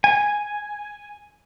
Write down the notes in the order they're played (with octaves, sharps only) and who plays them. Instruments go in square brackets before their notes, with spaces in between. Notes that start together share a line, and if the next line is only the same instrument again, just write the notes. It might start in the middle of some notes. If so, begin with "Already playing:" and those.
[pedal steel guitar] G#5